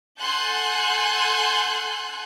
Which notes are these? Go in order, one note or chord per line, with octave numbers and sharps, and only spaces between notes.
A4 F#5 G#5 C6 F#6 G6